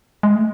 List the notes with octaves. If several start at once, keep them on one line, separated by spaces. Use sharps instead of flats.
G#3
A3